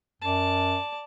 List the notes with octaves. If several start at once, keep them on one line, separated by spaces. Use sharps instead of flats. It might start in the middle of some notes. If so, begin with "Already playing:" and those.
F#2 D5 A5